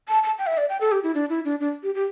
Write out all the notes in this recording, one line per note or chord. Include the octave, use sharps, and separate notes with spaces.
A5
A5
G5
E5
D5
G5
A4
G4
E4
D4
E4
D4
D4
G4
G4